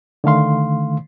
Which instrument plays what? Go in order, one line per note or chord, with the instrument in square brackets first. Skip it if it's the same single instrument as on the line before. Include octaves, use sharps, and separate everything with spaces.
[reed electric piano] D3 D#3 A3 F5 C6